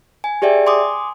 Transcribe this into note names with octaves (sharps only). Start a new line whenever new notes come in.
G#5
G4 G#4 D5 E5 G5
G#5 C6 D6 D#6